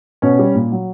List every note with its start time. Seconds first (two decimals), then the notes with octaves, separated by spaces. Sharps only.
0.22 B2 C#4
0.39 G3
0.55 A#2
0.72 F#3